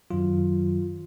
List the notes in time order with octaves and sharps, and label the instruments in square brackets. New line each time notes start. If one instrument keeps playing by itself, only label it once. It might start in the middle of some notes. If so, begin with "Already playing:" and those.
[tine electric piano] F#2 D#3 F#3 F4